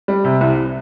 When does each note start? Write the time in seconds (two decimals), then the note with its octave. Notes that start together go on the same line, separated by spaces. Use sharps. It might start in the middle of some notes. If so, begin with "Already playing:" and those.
0.08 G3
0.24 C3
0.41 C2